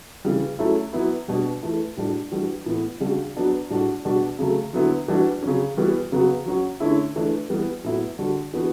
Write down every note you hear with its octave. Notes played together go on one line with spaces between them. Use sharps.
C#3 E3 G3
F#3 A3 C#4 E4
F#3 B3 E4
B2 G3 D4 F#4
E3 A3 E4
A2 G3 D4 F#4
E3 G3 D4 F#4
A2 E3 B3
C#3 G3 D4 F#4
F#3 B3 D4 F#4
A2 G3 D4 F#4
B2 G3 D4 F#4
C#3 F#3 A3
D3 F#3 B3 E4
E3 G3 D4 F#4
C#3 F#3 C#4
E3 G3 B3 F#4
C#3 F#3 B3 F#4
F#3 C#4 F#4
D3 A3 C#4 E4
E3 A3 D4
E3 G3 B3
A2 F#3 B3 E4
D3 G3 D4 F#4
E3 B3 D4 F#4